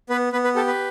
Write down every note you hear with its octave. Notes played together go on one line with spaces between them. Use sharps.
B3 B4
B3 B4
B4
G4 A4
B4